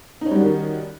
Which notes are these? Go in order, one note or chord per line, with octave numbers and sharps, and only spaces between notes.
D#3 G3 C#4 D#4 F#4